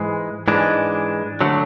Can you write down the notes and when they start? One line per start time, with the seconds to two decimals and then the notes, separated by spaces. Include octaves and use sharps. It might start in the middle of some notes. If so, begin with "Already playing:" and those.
Already playing: G#2 E3 G#3
0.48 G#2 E3 G#3 D4
1.41 D3 F#3 A3